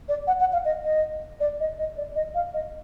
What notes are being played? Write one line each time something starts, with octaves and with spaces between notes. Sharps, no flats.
D5
F#5
F#5
F5
D#5
D#5
D5
D#5
D#5
D5
D#5
F5
D#5